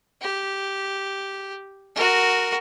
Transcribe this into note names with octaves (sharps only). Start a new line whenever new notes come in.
G4
F#4 A#4